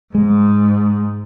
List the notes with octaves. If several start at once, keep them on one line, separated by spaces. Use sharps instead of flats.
G#2 G#3